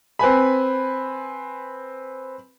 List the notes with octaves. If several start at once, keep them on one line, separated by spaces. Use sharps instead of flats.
C4 B4 G#5 B5